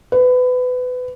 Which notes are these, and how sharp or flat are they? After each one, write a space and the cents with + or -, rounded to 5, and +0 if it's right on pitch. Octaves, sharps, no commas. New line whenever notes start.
B4 +25